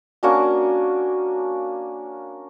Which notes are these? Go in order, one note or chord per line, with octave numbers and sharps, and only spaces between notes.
A#3 C#4 D4 F#4